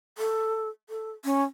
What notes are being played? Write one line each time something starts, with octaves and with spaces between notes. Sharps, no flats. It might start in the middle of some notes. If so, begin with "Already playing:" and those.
A4
A4
C#4